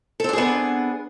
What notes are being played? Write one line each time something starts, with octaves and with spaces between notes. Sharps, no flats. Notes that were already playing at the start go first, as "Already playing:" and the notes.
B3 C4 D4 G#4 A4